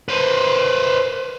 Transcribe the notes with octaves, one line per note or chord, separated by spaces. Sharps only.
B4 C5